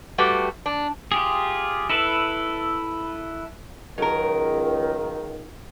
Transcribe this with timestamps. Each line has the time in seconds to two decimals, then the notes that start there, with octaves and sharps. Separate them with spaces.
0.18 G3 A3 F#4 G4 B4
0.66 D4
1.12 F4 G4 G#4
1.90 E4 A4 B4
3.98 C#2 D#3 F#3 A#4